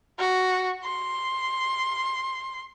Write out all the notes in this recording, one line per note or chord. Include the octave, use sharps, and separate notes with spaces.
F#4
C6